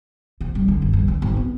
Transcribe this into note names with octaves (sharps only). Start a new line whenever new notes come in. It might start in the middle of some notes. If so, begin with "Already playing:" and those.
C3
G2
D3
F#1
G2
D3
G#1
B3